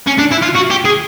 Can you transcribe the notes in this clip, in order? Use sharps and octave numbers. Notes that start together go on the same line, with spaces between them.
C#4
D4
E4
F4
F#4
G4
G#4